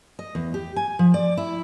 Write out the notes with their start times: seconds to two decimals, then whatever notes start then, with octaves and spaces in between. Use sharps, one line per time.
0.19 D#5
0.35 E2
0.54 G4
0.76 G#5
0.99 F3
1.14 D5
1.37 E4